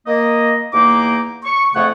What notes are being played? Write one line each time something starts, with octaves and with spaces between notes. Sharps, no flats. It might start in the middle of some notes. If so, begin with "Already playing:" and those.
A#3 D#5
E2 A#3 D#4 D6
C#6
F2 C#3 A3 C#5 F#5 C#6